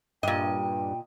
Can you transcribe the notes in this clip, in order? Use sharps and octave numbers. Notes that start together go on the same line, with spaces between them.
G2 A#2 D#5 G5